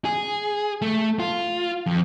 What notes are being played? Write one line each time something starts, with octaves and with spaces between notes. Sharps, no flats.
G#4
A3
F4
F2